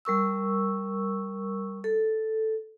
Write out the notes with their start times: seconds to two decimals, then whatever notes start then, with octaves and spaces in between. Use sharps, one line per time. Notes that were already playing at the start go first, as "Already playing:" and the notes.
0.05 G3 A#4 C#6 E6
1.84 A4